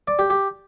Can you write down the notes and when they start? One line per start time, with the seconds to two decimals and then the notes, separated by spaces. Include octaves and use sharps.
0.08 D5
0.19 G4
0.30 G4